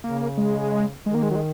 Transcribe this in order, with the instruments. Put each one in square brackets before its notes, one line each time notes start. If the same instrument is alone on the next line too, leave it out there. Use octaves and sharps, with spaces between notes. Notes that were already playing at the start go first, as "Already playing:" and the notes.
[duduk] C#3 [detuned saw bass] A#3
[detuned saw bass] G#3
[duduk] D#3 [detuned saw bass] G#3
[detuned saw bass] A#3
G#3
F#3
G#3